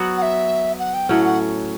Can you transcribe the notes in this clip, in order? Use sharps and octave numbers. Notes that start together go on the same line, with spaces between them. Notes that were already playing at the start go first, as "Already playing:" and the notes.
Already playing: F#3 B3 F#4
F#5
E5
F#5
G5
A2 F#3 C#4 F#5
F#5